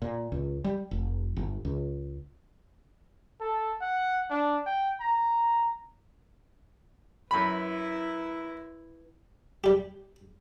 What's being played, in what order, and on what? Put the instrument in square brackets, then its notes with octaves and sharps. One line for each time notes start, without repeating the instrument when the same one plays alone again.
[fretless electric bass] A#2
C#2
G3
F1
G1
C#2
[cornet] A4
F#5
D4
G5
A#5
[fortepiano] F#2 B5 [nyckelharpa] E4 B4
[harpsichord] G3 G4